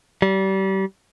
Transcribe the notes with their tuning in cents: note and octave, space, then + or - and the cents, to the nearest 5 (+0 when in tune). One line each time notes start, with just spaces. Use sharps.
G3 -30